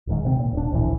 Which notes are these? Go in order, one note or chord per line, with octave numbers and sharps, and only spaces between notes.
D#1 G#1 G#2 D#3
C3 B3 C4
A#2
D#1 D4
D1 A#1 A#2 E3